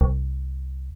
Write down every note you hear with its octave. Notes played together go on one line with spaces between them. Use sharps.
C2